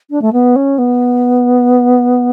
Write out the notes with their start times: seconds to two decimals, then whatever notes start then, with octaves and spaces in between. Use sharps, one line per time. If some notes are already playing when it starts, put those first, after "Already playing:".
0.10 D4
0.21 A3
0.32 B3
0.55 C#4
0.78 B3